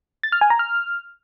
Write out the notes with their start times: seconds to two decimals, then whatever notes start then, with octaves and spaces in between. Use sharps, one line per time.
0.23 A6
0.32 F6
0.41 G#5
0.50 A#5
0.59 F6